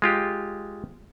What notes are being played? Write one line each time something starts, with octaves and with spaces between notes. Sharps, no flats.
G#3 F4 G4